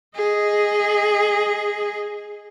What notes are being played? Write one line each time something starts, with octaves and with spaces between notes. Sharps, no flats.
G#4 D#5